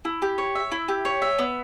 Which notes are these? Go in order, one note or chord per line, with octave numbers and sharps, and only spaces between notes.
E4
G4
C#5
E5
E4
G4
C#5
E5
B3